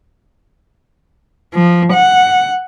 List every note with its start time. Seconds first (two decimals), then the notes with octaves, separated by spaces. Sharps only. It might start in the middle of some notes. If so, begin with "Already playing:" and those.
1.55 F3
1.93 F#5